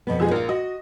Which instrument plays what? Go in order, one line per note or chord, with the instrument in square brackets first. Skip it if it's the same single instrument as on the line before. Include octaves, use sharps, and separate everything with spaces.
[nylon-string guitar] F2 B2 B3
[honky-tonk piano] F3 G#3 G#4
[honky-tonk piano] A#1 [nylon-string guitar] A#4 F5
[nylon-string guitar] F#4 [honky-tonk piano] D#5